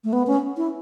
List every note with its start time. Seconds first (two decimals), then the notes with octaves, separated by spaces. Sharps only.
0.04 A3
0.13 B3
0.27 C#4
0.57 E4